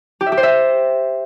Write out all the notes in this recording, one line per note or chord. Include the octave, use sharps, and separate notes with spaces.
G4
E5
G4
C5
E5